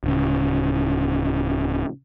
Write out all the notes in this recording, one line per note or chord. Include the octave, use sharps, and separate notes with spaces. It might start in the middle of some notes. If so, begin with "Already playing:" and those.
D1 C#3